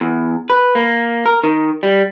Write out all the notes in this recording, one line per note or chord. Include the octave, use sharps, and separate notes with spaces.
E2
B4
A#3
A#4
D#3
G3